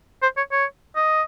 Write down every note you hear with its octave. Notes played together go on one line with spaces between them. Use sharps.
C5
C#5
C#5
D#5